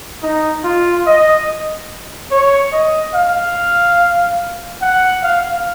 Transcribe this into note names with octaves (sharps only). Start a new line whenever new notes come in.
D#4
F4
D#5
C#5
D#5
F5
F#5
F5